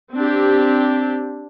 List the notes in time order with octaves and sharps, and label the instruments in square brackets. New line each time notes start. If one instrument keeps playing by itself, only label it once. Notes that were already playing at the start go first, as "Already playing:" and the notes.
[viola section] C4 D4 G4